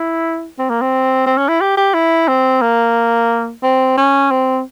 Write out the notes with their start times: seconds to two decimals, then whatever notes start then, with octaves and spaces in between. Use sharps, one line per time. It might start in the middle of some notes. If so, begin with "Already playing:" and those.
Already playing: E4
0.59 C4
0.70 A#3
0.81 C4
1.26 C4
1.38 C#4
1.49 E4
1.61 G4
1.77 G4
1.94 E4
2.28 C4
2.62 A#3
3.63 C4
3.97 C#4
4.31 C4